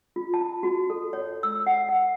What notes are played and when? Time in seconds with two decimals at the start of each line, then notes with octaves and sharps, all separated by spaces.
0.16 F4
0.34 A5
0.63 F#4
0.90 A4
1.13 C#5
1.43 E6
1.67 F#5
1.89 F#5